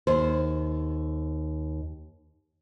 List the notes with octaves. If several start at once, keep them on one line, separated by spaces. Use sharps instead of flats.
D#2 C5